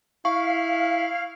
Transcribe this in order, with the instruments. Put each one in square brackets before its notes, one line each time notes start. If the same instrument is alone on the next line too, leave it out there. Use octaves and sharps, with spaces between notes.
[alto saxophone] E4 [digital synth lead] F5 [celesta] C#6